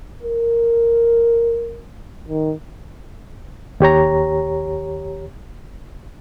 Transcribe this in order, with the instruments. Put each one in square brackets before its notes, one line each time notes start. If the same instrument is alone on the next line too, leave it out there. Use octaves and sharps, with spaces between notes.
[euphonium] A#4
D#3
[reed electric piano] D#2 G4 C#5 A#5